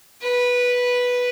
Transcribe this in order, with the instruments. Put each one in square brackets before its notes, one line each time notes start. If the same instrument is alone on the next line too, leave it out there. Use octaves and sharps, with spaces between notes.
[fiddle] B4